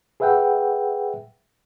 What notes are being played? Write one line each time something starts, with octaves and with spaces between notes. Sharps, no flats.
G#4 B4 E5 F#5 G5